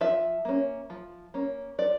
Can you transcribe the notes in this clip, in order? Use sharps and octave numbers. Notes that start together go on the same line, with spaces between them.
F3 E5
A#3 C#4
F3
A#3 C#4
F3 D5